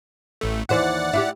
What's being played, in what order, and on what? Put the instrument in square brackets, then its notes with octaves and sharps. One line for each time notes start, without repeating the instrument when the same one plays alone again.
[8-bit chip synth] A1 A3
[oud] D#2 E3 C5 [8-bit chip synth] D5 F#5
[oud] E4 F4 G4